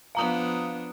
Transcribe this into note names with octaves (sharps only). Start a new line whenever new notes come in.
F3 B3 D4 F5 A#5 D#6